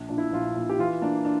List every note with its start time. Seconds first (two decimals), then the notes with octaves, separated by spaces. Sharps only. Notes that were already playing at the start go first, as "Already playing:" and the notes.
Already playing: A#1
0.08 A#2 D4
0.18 E4
0.32 A#1 F4
0.56 A#2
0.69 G4
0.79 E3 F4
1.02 A#3 D4
1.25 D4